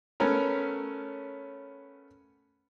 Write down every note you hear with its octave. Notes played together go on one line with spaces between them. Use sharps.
A3 B3 C#4 A#4